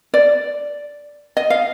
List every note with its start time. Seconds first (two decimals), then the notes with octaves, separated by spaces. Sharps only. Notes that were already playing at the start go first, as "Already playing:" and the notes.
0.14 D5
1.37 D#5
1.50 F5